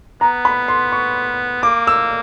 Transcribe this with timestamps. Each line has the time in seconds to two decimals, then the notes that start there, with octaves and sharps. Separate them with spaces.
0.21 B3 A#5
0.45 B5
0.68 C6
0.92 C#6
1.63 A#3 D6
1.87 E6